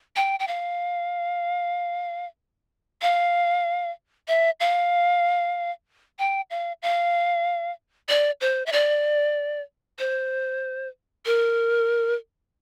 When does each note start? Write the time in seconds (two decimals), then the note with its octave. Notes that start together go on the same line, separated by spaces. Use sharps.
0.16 G5
0.39 G5
0.47 F5
3.02 F5
4.28 E5
4.60 F5
6.19 G5
6.50 F5
6.82 F5
8.09 D5
8.41 C5
8.66 E5
8.72 D5
9.99 C5
11.26 A#4